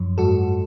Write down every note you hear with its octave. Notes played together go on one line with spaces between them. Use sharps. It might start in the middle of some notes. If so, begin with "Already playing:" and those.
Already playing: F#2 F3
G#2 F#4 A4